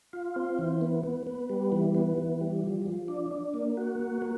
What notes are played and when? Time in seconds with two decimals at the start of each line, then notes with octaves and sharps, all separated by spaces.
0.13 F4
0.36 C4
0.59 E3
0.81 B3
1.03 B3
1.27 B3
1.50 G3
1.72 E3
1.95 B3
2.18 E3
2.41 G3
2.64 F3
2.86 F3
3.08 D4
3.31 D4
3.54 A#3
3.77 F#4
3.99 A#3
4.22 A#3